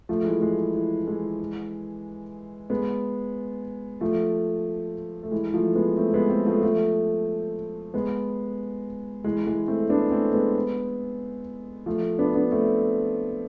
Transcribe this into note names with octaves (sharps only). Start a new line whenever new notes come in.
F3 A3
E3 G#3
E3 G#3
E3
E3
E3 G#3
G#3 B3
F3 A3
A3
E3 G#3
F3 A3
G#3 B3
A3 C4
G#3 B3
A3 C4
F3 A3
F3 A3
G#3 B3
E3 G#3
E3 G#3
A3 C4
B3 D4
A3 C4
G#3 B3
F3 A3
B3 D4
B3 D4
A3 C4